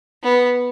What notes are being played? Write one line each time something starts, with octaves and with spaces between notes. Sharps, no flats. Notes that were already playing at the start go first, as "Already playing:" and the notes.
B3